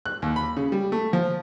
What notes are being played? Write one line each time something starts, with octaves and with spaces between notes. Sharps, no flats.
F#6
D#2
B5
C#3
G3
A3
F3